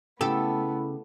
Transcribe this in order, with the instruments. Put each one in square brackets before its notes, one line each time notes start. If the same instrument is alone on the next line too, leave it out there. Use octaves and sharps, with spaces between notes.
[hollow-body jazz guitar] C#3 G4 [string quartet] A3 B3 [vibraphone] E4 B5 [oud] A4